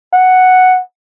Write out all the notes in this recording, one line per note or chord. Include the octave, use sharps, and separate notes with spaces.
F#5